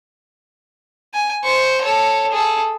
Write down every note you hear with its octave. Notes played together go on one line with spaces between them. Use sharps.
G#5
C5 C#6
A4 C#5
G#4 A4